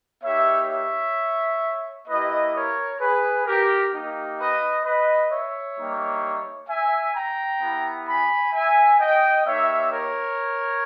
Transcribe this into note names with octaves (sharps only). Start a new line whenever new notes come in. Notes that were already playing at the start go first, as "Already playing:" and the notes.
A#3 D#4 G4 C#5 E5
C#5 E5
A#3 E4 G4 B4 D#5
A#4 C#5
G#4 B4
G4 A#4
A#3 D#4 G4
B4 D#5
B4 D#5
C#5 E5
G3 A#3 D#4 G4
E5 G#5
G5 A#5
B3 E4 G4
G#5 B5
E5 G#5
D#5 G5
A#3 D#4 G4 C#5 E5
A#4 C#5